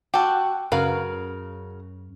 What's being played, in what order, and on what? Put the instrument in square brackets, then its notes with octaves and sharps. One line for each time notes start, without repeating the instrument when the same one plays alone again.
[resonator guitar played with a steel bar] F#4 [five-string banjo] G4 A4
[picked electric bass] F#2 C#4 [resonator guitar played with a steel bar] C#3 F#4 A#4 [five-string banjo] B4 F5